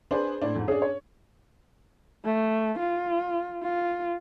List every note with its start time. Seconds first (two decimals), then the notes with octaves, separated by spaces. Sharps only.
0.11 D4 G#4 B4 C5
0.42 A2 D4
0.55 F2 G#2
0.68 C#4 D4 G#4
0.82 C#5
2.25 A3
2.79 F4
3.63 F4